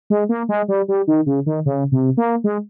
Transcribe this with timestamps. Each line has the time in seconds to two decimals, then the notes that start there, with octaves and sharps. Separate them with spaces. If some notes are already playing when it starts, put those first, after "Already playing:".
0.10 G#3
0.29 A#3
0.49 G#3
0.68 G3
0.88 G3
1.07 D#3
1.26 C#3
1.46 D#3
1.66 C#3
1.92 C3
2.17 A#3
2.44 G#3